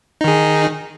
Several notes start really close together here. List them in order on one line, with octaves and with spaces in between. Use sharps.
D#4 D#3 G#4